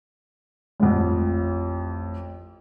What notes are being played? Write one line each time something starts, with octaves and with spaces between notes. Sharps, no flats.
A1 F2